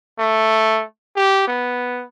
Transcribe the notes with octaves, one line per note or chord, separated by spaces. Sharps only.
A3
G4
B3